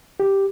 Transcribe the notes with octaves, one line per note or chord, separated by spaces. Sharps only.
G4